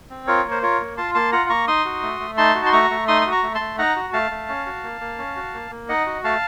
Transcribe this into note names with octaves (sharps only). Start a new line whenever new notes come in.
C4
F4 A#4 C#5
A#3
C5
F4 A#4 C#5
A#3
F4 A5 C6
A#3 A5 C6
F4 F#5 A#5
A#3 A#5 C#6
D#4 C6 D#6
F#4
A3
A3
D#4 A5 C6
F#4
C6
A3 A#5 C#6
A3
D#4 C6 D#6
F#4 D#6
A#5 C#6
A3
A5 C6
A3
D#4 F#5 A#5
F#4
A3 F5 A5
A3
C#4
F#4
A#3
A#3
C#4
F#4
A#3
A#3
D#4 D#5 F#5
F#4
A3 F5 A5